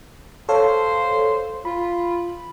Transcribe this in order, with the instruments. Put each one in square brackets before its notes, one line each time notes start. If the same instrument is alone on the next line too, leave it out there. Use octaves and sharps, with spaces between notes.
[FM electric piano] A4 C#5 F5 [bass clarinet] C5
[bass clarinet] F4 [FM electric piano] B5